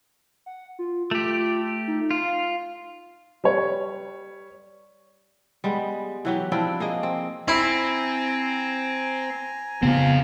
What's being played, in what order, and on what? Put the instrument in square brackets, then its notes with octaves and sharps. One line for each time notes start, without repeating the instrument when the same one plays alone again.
[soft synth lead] F#5
F4
[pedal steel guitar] A3 G4 [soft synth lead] F4
[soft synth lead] D#4
[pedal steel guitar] F4 [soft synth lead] F5
[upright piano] G3 B4 C#5
[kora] G3 G#3 B3
E3 F#3 G4
F3 C4 D4 E4
A#3 G#4 D#5
C4
[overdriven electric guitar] C4 [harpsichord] E4 [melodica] G#5 A#5
[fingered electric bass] C#3 B3 [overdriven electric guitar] C4 F4